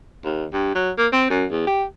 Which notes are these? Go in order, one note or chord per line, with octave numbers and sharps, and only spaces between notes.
D#2
G2
F#3
A#3
C4
F#2
E2
G4